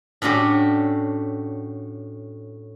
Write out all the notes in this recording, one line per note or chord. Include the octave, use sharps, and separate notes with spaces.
A2 C#4 D4 F#4 G4